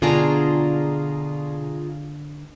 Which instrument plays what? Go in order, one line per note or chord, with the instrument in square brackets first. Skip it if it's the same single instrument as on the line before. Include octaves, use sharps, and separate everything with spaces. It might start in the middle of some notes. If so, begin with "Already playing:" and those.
[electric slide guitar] B2 D4 [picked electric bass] D3 [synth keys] F4 G#4 A#5